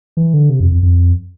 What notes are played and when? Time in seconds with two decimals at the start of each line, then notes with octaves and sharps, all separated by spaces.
0.17 E3
0.34 D3
0.50 C3
0.60 F2
0.72 F2
0.83 F2